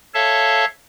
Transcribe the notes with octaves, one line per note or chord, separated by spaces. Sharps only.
A4 C#5 E5 F5 A5